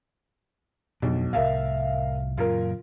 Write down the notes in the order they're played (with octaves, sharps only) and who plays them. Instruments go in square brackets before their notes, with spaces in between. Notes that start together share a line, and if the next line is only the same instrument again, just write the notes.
[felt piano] B1 [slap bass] F2 B2 D4
[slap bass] C2 A2 [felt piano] A#4 E5 F5
[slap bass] F#2 A#2 C#3 [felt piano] F4 A#4